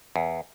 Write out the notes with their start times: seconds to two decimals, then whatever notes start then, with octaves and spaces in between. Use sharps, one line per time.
0.16 E2